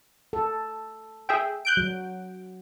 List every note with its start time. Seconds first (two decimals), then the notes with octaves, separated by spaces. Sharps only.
0.33 A4
1.29 G#4 E5 G5
1.65 F#6 G6 D7
1.77 F#3